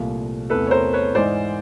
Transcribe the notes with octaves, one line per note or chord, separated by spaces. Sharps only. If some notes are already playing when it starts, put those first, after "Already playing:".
Already playing: C2 A#2 F3 A3
E2 C3 E3 A3 A4 B4
C#5
A#4 C5
B4 C#5
G#2 E3 G#3 C5 D5